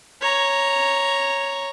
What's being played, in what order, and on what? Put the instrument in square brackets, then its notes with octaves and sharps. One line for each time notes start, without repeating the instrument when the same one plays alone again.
[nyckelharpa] C#5 A#5